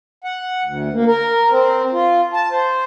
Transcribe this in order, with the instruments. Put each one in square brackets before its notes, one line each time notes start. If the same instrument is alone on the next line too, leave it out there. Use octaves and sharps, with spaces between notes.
[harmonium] F#5
D2
A#3
A#4
C4
F4
A5
C5